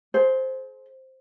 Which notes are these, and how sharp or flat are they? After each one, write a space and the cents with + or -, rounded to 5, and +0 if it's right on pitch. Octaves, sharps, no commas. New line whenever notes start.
G#4 +45 C5 +0